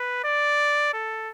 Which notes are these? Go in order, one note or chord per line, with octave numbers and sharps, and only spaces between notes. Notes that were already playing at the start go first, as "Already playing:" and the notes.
Already playing: B4
D5
A4